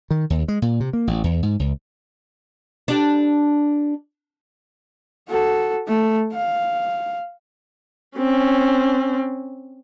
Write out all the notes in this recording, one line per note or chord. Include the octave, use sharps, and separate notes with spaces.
D#3
D#2
G#3
A#2
C3
A#3
A1
E2
G#2
C#2
D4 G4
F#4 A4
A3
F5
C4 C#4